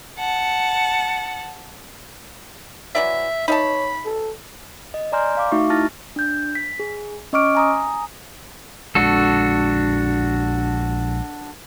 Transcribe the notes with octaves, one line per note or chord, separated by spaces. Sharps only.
F#5 A5
E3 F#3 D5 E5
D#4 C#5 E5 A5 B5
A4
D#5
D5 G#5 A#5 C6 F6 G6
F5 D6
A3 D#4 F#4 E5 C#6
E4 A5 F6 A6 A#6
D4 G6
B6
G#4
C#4 D#5 C#6 D6 F6 D7
G#5 A#5 D#6
A#1 G#3 D4 F#4 A4